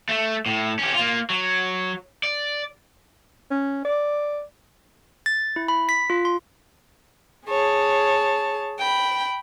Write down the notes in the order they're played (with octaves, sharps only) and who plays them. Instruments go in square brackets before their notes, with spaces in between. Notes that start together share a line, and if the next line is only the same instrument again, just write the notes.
[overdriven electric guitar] A3
A2
C#4 G4
A#3 F4
F#3
D5
[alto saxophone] C#4
D5
[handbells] A6
E4
B5
B6
F4
C6
[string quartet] G#4 C#5 A5
G5 B5